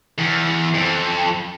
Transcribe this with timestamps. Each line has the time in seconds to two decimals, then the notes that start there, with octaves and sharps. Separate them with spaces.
0.18 E2
0.74 F2